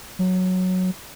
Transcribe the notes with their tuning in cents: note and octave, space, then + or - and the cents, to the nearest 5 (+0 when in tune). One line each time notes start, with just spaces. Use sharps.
F#3 -5